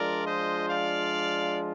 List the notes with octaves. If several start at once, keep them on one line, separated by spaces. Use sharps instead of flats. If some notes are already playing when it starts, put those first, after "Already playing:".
Already playing: F3 G#3 D4 F4 A#4 D5
C5 D#5
D5 F5